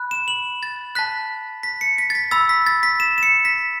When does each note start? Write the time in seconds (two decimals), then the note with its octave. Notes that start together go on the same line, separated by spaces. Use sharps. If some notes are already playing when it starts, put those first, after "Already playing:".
Already playing: B5 F#6
0.11 E7
0.28 F#7
0.63 A6
0.95 A5 F#6 B6
1.63 B6
1.81 C#7
1.98 B6
2.10 A6
2.15 B6
2.31 B5 E6 A6
2.49 B6
2.67 A6
2.83 B6
3.00 E7
3.18 E7
3.23 C#7
3.45 B6